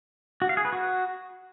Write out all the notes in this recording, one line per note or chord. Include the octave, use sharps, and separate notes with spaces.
F#4
F5
G#4
B4
F#4